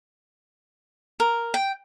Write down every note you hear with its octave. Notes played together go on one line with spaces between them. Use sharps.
A#4
G5